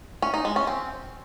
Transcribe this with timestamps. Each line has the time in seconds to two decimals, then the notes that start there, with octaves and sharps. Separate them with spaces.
0.22 C#4
0.34 D#4
0.45 G#3
0.56 C#4
0.67 C4